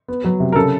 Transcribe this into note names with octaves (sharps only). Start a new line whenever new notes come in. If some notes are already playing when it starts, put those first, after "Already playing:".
B3
F#3
C3
A#4
C#3 A4